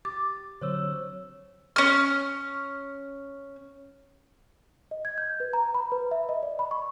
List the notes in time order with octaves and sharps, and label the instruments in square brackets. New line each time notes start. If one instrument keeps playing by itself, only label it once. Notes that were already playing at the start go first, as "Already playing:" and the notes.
[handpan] G4 [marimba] D6 [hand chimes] A6
[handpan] D3 F#3 C4 [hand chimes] C5 C#5 E6
[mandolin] C#4 F6
[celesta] D#5
G#6
G6
B4
A#5
B5
B4
E5
D#5
D5
B5
C#6